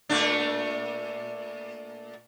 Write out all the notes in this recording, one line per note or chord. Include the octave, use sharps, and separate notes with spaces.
A#2 A3 D4